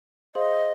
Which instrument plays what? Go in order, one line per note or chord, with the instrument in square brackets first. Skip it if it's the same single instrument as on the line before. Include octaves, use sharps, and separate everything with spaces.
[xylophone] G#4 C5 F5 C6 [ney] D#5